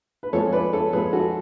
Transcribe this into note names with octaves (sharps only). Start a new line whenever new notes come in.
B4
F2 F3 G#3 A4 C#5
B4 D5
A4 C#5
F2 F3 G#3 G#4 B4
F#4 A4